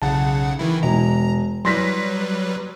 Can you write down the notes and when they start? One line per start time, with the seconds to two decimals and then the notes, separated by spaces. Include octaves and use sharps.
0.02 B1 C#3 F#5 A5
0.59 D#3 E3 E4
0.83 E1 A#5
1.65 F#3 G3 B4 C6 A#6 B6